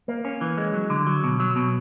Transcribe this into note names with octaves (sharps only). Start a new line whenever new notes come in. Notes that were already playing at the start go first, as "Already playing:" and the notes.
A#3
C#4
E3
G#3
F#3
D3
F#3
B2
F#3
B2